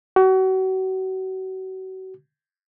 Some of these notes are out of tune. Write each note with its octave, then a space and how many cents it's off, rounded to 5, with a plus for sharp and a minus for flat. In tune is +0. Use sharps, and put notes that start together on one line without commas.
F#4 +35